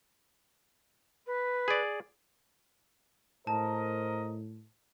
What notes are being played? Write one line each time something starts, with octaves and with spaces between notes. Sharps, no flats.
B4
G#4 D5
A2 A#4 C5 D#5 A5